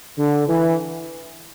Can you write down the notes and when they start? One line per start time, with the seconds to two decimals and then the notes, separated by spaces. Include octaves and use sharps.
0.18 D3
0.48 E3